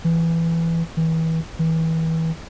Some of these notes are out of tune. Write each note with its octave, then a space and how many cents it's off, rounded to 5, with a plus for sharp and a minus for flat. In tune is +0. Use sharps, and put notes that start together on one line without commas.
E3 +10
E3 -30
E3 -30